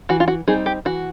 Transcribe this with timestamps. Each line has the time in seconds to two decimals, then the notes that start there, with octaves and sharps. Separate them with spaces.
0.09 E3 F#4
0.20 F4
0.28 F#4
0.47 G3 C4 D#4 G#4
0.66 G4
0.85 E3 F#4